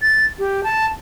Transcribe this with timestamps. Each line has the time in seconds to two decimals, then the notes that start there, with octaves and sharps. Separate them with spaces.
0.02 A6
0.39 G4
0.64 A5